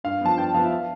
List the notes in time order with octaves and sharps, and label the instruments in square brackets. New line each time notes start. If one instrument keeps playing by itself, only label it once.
[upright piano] G2 F5
F3 B3 A5
G2 G5
F3 B3 F5
E5
F5